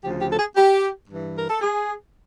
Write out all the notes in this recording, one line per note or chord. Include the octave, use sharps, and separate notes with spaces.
D2 C#3 F3 G4
G4
A4
G#4
G4
G2 E3
A#4
A4
G#4